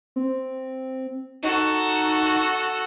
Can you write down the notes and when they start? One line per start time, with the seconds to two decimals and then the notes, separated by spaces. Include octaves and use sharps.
0.16 C4
1.43 D#4 F#4 A4